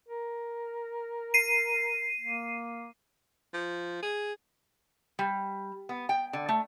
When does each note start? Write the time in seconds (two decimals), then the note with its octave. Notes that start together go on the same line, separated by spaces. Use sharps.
0.08 A#4
1.34 C7 D#7
2.20 A#3
3.54 F3
4.03 G#4
5.19 G3
5.89 B3
6.09 G5
6.33 D3
6.49 A3